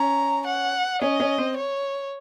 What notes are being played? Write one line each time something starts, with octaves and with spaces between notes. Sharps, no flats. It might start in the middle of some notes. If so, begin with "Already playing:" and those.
Already playing: C#4 A#5
F#5
C#4 D#5
C#4
C4
C#5